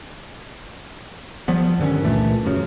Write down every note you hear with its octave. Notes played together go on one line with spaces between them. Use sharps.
F3 G3 B3
G2 D3 D#3 C#4
C#2 A#2 E3 A3
F#2 C#3